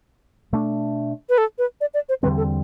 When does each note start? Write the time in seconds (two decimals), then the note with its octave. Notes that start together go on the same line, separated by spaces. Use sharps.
0.52 B2 A3 D4
1.29 B4
1.38 A4
1.58 B4
1.81 D5
1.94 D5
2.09 C5
2.23 E2 D3 G3 C4 B4
2.37 A4